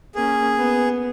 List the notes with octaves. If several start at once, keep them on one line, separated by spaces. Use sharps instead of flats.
A#3 C#4 G#4
B3